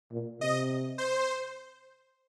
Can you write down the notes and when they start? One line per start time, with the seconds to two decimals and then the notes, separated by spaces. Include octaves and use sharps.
0.12 A#2
0.40 C3 D#5
0.98 C5